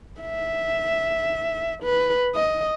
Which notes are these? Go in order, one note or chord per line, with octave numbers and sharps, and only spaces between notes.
E5
B4
D#5